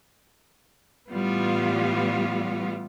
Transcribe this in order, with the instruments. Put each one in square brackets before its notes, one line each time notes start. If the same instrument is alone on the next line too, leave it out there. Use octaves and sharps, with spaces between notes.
[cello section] A2 E3 G3 B3 F4